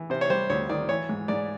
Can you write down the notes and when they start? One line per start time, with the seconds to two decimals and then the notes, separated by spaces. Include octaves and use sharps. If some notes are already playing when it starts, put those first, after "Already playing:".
Already playing: E3
0.10 C3 C5
0.21 C#5
0.30 G3 C5
0.50 D2 C#5
0.69 D#3 D5
0.89 E3 C#5
1.09 G#2
1.28 G#2 D5